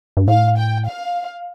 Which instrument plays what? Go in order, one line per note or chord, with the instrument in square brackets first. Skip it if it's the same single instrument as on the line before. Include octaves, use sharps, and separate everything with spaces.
[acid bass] G2
[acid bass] A2 [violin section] F5
[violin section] G5
F5